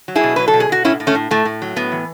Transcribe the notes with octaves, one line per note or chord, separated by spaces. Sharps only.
F#3
E4 G#4
B2
F#3 B4
A4
B2
G#4
B2 F#4
A2 C#4 E4
A2
A3 C#4
A2
A2 A3
A2
F#3
A2 B3
E3